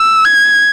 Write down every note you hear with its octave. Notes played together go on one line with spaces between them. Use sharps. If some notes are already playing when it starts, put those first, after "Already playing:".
Already playing: E6
G#6